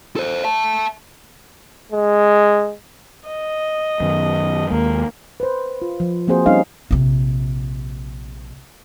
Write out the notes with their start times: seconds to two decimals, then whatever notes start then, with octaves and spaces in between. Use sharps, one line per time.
0.16 A4 C5
0.44 E5 A5
1.92 G#3
3.28 D#5
4.00 F#2 D#3
4.70 D#2 G#3 A#3
5.40 B4 C5
5.82 F4
6.00 F3
6.28 F3 A#3 C4 F#4 G#4 C5
6.46 G3 C4 C#4 D#4 G#4 F5
6.91 A#1 C3